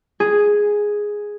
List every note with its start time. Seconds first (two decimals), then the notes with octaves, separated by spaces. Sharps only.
0.20 G#4